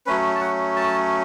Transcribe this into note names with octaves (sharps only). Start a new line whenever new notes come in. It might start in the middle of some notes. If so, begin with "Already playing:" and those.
F#3 A3 C#4 B4
A5
F#5
A5